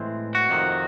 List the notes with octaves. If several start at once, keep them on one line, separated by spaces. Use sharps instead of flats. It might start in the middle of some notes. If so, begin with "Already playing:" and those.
Already playing: A2 E3 G#3 C4
F#4
F2 C3 D#3